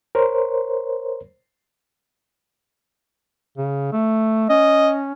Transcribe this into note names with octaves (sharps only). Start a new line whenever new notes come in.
A#4 C5 C#5
C#3
A3
C#4 D#5